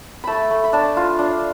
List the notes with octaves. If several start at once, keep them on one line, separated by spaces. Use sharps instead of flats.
A3 A5 B5
A3
B5
D4 A5
F4
D4